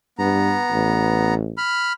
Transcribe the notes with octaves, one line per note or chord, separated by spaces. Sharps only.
G2 B3 A#5
A1
B5 F6